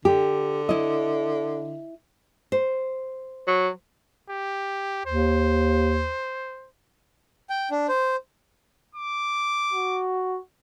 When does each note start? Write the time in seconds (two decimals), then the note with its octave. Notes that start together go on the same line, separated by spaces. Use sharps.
0.05 D3 G4
0.69 E4 D#5
2.52 C5
3.47 F#3
4.29 G4
5.06 D#2 C5
7.50 G5
7.71 D4
7.88 C5
8.95 D6
9.73 F#4